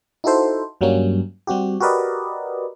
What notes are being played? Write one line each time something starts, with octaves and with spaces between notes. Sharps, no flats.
D#4 E4 F#4 A4 C5
G2 F#3 G3 A#3 C#4
G3 C4 F#4 G4
F#4 G4 A#4 B4 D5 D#5